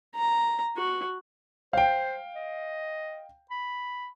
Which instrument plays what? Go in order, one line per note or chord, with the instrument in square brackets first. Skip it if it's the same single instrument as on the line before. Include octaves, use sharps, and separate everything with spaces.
[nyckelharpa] A#5
F#4
[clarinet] C5 [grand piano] F5 G5
[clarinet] D#5
B5